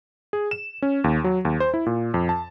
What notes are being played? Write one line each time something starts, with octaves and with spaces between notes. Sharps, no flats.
G#4
E7
C#4
D#2
F#3
D#2
C5
E4
A#2
F2
A5